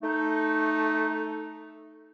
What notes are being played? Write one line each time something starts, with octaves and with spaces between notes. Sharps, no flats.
A3 D#4